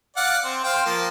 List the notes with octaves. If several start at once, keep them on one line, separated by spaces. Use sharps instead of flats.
D5 F5 F#5
C4
C5 F5 G5
F3 A#3